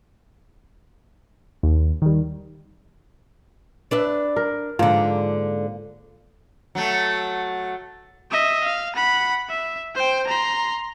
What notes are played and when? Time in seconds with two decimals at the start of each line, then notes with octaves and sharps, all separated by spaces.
1.63 D#2
2.02 D#3 G3
3.91 D4 B4 E5
4.36 A#4
4.79 G#2 D3 F3 A#3
6.75 F#3 A3
8.31 D#5 E5
8.64 F5
8.95 F#5 B5
9.49 E5
9.95 C5 G5
10.27 A#5 C6